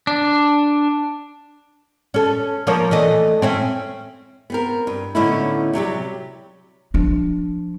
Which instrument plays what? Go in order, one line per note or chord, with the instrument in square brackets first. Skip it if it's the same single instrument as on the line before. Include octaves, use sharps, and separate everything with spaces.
[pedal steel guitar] D4
[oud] C#4 A4
F3 A#3 C#5
E3 A3 D#5
C4 C#4 E4
[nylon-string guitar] B3 C4 A#4
G2
A2 D3 B3 C#4 D#4 E4
C3 F#3 G3 G4
[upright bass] F3 D4